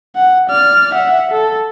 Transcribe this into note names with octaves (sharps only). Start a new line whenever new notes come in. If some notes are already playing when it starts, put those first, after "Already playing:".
F#5
D5 F6
E5 F#5
A4